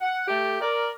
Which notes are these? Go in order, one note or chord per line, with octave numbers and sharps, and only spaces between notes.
F#5
A3 G4
A#4 D5